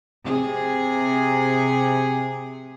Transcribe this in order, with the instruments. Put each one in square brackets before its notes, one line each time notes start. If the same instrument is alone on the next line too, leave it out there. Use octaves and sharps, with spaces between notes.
[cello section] C3 G#4